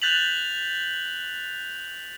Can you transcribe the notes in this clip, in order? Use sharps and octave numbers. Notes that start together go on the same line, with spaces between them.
F#6 G6 A6 B6 F7 F#7